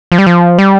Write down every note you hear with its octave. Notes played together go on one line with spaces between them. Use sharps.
F3
G3
F3
G3